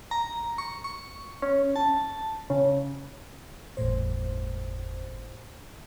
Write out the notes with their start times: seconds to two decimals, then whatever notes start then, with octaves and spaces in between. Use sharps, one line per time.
0.11 A#5
0.58 C#6
0.84 C#6
1.42 C#4
1.76 A5
2.50 C#3
3.77 G1 E2 A2 C5